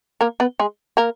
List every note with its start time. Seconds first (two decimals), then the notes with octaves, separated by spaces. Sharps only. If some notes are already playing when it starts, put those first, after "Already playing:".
0.21 A#3 A#4
0.40 B3 B4
0.60 G#3 G#4
0.97 A#3 A#4